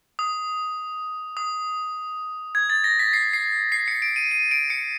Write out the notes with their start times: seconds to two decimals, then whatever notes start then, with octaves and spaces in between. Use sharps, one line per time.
0.19 D#6
1.37 D#6
2.55 G#6
2.70 A6
2.84 A#6
2.99 B6
3.13 C7
3.33 C7
3.72 C7
3.88 C#7
4.02 D7
4.16 D#7
4.31 D#7
4.51 D7
4.70 C#7